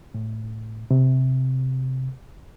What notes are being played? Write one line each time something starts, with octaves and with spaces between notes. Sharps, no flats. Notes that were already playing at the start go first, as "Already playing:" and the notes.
A2
C3